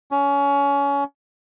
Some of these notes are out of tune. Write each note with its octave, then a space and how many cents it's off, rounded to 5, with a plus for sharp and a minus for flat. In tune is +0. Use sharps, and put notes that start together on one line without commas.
C#4 +25